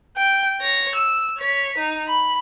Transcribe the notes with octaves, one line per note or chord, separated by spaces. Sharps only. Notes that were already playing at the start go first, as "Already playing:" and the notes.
G5
C#5 A#6
E6
C#5 B6
D#4
B5